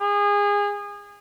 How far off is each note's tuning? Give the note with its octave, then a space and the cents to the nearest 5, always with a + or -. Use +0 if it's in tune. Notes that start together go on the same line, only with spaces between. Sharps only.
G#4 -25